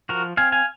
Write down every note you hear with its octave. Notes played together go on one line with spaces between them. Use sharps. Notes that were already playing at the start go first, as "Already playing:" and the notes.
F3 F#4 A#4
C4 F5 G#5
F5 G#5